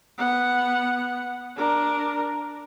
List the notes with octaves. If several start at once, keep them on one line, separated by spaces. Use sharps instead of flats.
B3 F#5
D4 A#4